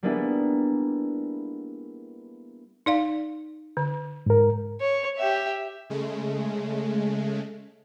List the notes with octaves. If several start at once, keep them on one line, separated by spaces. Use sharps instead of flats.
G3 A#3 B3 D4 E4 G#4
D#4 D5 F5
D3
G#2 A#4
C#5
G4 E5
C#3 G#3 A3